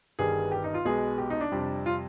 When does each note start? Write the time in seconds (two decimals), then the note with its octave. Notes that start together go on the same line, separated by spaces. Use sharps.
0.19 G1 G2 D#3 G3 G#4
0.52 G4
0.64 D#4
0.74 F4
0.85 B1 B2 G#3 B3 G#4
1.18 G4
1.30 D#4
1.41 D4
1.52 F2 C3 G3
1.86 F4